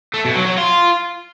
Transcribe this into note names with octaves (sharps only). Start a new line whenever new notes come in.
A3
B2
F#3
F#3
F4